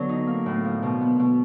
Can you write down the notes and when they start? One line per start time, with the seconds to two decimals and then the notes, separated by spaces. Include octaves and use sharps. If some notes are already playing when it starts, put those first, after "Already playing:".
Already playing: D3 F#3 B3
0.09 D#4
0.27 A#3
0.46 A2
0.64 F3
0.83 B2
1.01 B3
1.20 B2